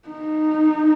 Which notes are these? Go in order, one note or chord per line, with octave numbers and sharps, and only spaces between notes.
D#4